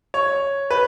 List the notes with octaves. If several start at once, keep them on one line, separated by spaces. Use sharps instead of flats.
C#5
B4